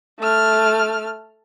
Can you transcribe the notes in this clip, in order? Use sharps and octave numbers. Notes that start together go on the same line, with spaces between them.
A3 F6